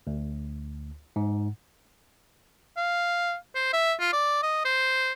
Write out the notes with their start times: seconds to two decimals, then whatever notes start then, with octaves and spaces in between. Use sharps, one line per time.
0.07 D2
1.16 G#2
2.77 F5
3.55 C5
3.73 E5
4.00 F4
4.13 D5
4.43 D#5
4.65 C5